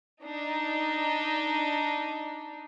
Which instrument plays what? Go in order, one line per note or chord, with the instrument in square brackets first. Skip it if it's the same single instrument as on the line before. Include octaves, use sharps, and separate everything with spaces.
[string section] D4 D#4